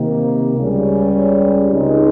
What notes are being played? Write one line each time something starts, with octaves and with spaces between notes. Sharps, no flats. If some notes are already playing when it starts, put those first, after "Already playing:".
Already playing: C3 D#3 A#3
C#2 C#3 G3 C#4
C#2 C#3 G#3 C4 D#4